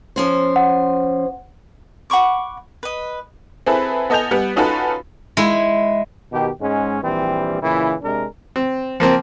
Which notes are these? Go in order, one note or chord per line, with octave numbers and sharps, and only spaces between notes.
F3 C#4 C5
F#5
F#5 B5 C#6 D6
B4 D#5
C4 E4 G#4 A4 B4
B3 A4 D#5 G#5 G6 F7
G3 B3 F#5
C#4 D#4 F4 F#4 A4 B4
G#3 E4
B2 D#3 G4
G#2 G#3 C#4
A#1 E3 G3 C4
A#2 C#3 E3 E4
C3 G#3 D4 A#4
C4
F3 A#3 C4